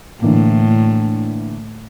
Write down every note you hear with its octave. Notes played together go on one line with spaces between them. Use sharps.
A2 D3 E3 A#3